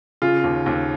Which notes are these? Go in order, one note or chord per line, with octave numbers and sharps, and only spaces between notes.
C#3 F4
D#2
D#2